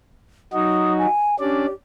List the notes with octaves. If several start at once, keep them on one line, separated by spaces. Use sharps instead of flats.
F#3 D#4 F#4 D#6
G#5
C#4 D4 G4 D5